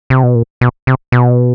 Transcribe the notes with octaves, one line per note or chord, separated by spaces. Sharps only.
C3
B2
A#2
B2
C3
B2